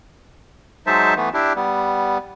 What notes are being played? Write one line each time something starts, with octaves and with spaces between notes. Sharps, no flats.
F#3 G#3 D#4 C5 E5 A5
E3 A3 B3
D4 E4 G4
G3 B3